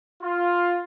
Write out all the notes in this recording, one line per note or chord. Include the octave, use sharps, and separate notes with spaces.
F4